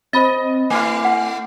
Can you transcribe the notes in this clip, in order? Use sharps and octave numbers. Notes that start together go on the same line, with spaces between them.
C4 C5 D#5 B5 A6
A3 E4 G#5
F#5